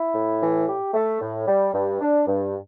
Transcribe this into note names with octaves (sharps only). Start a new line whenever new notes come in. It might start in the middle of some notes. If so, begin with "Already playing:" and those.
Already playing: E4
A2
E3
G4
A3
A2
G3
G2
D4
G2